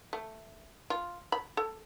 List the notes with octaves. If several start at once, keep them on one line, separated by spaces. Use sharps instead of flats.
A3
F4
B5
A4